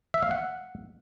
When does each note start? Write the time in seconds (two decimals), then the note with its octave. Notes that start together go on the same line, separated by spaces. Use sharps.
0.14 E5
0.23 F5
0.31 F#5